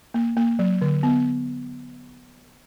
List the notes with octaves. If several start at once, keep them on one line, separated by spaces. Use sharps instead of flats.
A#3
A#3
F#3
D3
B3